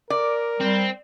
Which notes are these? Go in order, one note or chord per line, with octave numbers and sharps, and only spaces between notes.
A#4 D5
G3 C4